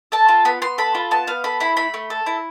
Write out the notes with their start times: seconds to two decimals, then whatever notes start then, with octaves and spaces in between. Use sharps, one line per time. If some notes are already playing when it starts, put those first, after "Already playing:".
0.12 A4 A5
0.29 F4
0.45 B3 B5
0.62 B3 C6
0.78 A4 B5
0.95 F4
1.11 B3 A5
1.27 B3 F5
1.44 A4 B5
1.60 E4 B5
1.77 A3 B5
1.94 A3
2.10 A4
2.26 E4